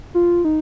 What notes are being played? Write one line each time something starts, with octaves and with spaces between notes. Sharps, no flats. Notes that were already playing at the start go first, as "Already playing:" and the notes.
F4
D#4